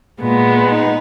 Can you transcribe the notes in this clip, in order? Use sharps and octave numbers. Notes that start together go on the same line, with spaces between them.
A#2 G#3 B3
D#4